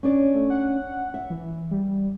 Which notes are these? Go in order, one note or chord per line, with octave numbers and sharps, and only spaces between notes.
C#4 D4 D5
A3
F#5
E5
E3
G3